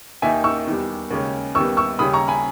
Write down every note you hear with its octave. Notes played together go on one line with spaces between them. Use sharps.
D#2 D#3 A#3 D#4 E5 G#5
C#6 E6
E2 D#3 G3
D#2 C#3 G#3 C#4
D#2 D#3 G3 B3 C#6 E6
C#6 E6
D#2 C#3 G3 C#4 B5 D#6
A#5 C#6
G#5 B5